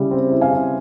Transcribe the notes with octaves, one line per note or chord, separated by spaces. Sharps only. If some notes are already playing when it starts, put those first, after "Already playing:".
Already playing: C#3 G3 E4
C4
E4
F5 G#5
C#3